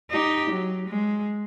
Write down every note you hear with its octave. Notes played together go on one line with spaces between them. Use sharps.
D#4 G4
F#3
G#3